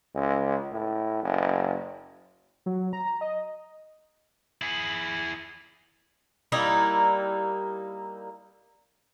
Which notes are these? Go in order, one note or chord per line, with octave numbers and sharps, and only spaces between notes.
C#2
A2
F#1
F#3
A#5
D#5
E4 G#4
G3 A#3 D#4 E4